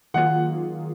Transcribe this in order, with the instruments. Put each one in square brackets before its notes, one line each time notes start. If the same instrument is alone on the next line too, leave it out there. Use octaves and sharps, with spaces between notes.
[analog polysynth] D#3 F#3 A#3 F4 G#4 [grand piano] F#5